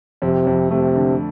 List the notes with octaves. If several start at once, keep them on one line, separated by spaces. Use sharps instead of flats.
F2 C3
F2
C3 A3
D3